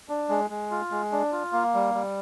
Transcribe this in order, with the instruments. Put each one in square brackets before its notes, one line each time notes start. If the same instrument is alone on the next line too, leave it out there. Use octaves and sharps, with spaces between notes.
[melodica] D4
G#3
G#3
F4
G#3
D4
F4
A#3
G3
G3